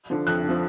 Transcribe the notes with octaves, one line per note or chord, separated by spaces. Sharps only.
D3 F3
F2 F#6
D3
F3